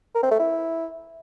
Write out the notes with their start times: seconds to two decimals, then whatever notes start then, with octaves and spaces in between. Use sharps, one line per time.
0.15 A#4
0.23 C4
0.31 A3
0.39 E4